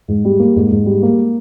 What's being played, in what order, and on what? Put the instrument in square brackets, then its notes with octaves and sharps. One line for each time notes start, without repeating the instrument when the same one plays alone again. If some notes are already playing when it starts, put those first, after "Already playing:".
[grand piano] G#2
G3
A#3
G#2
G#2
G3
A#3